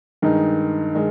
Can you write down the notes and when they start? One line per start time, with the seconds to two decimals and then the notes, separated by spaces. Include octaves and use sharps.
0.22 G2 D#3 G#3 D#4
0.95 D#3 G#3